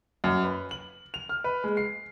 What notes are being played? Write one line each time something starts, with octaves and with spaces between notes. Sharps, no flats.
F#2
B4
F#7
F7
F6
B4
G#3
C7